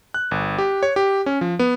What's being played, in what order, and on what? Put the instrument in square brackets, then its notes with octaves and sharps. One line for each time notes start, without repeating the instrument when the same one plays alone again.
[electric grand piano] F#6
G1
G4
C#5
G4
C#4
F3
B3